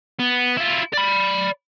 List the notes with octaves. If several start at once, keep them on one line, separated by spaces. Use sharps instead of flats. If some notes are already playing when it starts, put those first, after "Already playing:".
B3
E4 F4
D5 B5